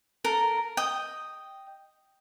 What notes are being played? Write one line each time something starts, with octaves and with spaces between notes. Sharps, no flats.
A4 A#4 A#5
D#5 G5